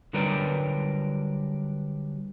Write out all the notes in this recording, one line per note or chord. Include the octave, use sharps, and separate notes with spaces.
D3 F#3 G3 A#4 B4 D5